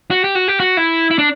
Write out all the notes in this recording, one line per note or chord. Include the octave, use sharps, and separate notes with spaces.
F#4
G4
F#4
G4
F#4
E4
E4
D4